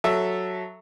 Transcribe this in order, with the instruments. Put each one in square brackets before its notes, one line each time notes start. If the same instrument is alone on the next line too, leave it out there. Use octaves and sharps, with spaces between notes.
[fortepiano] F#3 A4 E5